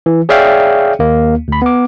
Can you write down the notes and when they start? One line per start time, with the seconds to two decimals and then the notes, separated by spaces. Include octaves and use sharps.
0.06 E3
0.29 G#4 C#5 D5 E5 F5 G5
0.99 D#2 A#3
1.48 D2 B5
1.62 B3 D6